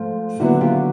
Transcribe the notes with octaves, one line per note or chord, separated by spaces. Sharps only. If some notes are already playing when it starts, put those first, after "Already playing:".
Already playing: G#2 F3 A3
D#2 D3 F#3 B3 E4 F#4
F4 G4